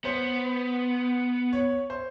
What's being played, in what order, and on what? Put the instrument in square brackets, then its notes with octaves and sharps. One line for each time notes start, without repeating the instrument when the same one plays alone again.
[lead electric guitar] B3 [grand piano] C5
[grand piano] C#5
C5